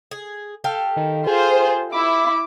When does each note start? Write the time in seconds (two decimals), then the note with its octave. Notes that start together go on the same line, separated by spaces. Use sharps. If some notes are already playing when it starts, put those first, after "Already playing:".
0.11 G#4
0.64 G4 A4 F5
0.97 D#3
1.27 F4 G#4 C5
1.92 E4 D6